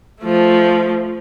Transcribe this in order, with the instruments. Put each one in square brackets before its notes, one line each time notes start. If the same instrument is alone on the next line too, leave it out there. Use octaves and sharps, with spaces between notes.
[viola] F3 A3